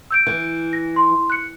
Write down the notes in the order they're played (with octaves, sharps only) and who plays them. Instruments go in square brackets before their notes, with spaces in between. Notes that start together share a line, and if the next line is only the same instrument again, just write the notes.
[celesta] E6 G6 D7
[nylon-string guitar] E3
[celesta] A#6
C6
F#6 C#7